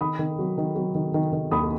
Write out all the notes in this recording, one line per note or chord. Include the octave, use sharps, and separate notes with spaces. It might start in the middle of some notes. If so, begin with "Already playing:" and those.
D#3 B5 D#6
D#3
F#3
D#3
F#3
D#3
D#3
D#3
D#2 B5 D#6